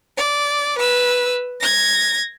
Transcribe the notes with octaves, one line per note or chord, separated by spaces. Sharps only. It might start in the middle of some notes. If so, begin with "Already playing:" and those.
D5
B4 E6
G#6 A#6